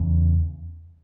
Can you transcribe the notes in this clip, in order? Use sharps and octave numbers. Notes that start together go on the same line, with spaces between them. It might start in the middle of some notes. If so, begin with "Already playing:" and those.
Already playing: E2 C#3 C#4